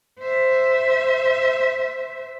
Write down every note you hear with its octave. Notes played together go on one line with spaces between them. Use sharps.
C5 E5